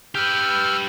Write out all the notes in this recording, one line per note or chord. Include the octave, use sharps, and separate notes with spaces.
G4 B4 E6 F6 G6